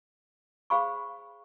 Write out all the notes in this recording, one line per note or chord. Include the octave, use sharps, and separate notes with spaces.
G#4 C5 F5 B5 C#6